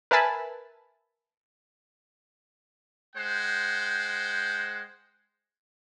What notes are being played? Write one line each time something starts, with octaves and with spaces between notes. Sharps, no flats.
A#4 B4 E5 G#5 A5 B5
G#3 C5 F#5 G5